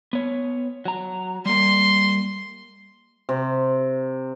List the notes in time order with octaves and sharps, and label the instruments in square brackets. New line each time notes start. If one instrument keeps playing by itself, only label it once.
[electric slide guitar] B3 C#5
F#3 A#5
[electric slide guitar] G3 A#3 [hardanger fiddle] C6
[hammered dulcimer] C3